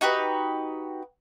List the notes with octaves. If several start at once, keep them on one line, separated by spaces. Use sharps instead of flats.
D#4 F#4 G4 B4